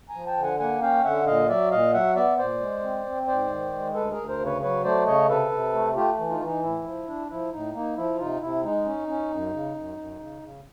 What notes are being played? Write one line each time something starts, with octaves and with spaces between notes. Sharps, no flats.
G#5 A#5
F3
G5 A5
D3
F#5 G#5
A#3 F#5 G#5
C#4 F5 G5
D3 E5 F#5
A#2 D#5 F5
F#3 D5 E5
A#2 D#5 F5
F#3 E5 F#5
B3 D5 E5
A#2 C5 D5
G#3
C4
C4
G#2 C5 D5
D#3
G#3
D2 A4 B4
G#4 A#4
D2
A#4 C5
C#3
B4 C#5
F#3 B4 C#5
A3 C5 D5
C#3 C#5 D#5
C3 A4 B4
C3
A3
A3 F4 G4
E3
D#4 F4
E3
D#4
A2 E4
F3
D4
F3 E4
A2 D#4
A#3 D#4
F3 E4
C3 D#4 F4
C3 E4
G#3 D#4
C#4
C#4
F#2
C#3
F#2
F#2
C#3
C#3